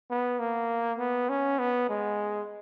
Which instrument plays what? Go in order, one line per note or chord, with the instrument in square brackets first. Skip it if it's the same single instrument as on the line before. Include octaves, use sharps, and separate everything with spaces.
[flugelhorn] B3
A#3
B3
C#4
B3
G#3